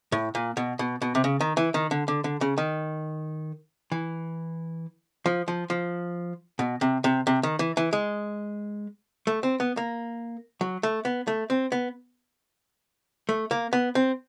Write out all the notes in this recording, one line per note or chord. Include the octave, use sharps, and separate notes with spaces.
A2
A#2
B2
B2
B2
C3
C#3
D#3
E3
D#3
D3
D3
D3
C#3
D#3
E3
F3
F3
F3
B2
C3
C3
C3
D#3
E3
E3
G#3
A3
C4
B3
A#3
F#3
A3
B3
A3
C4
B3
A3
A#3
B3
C4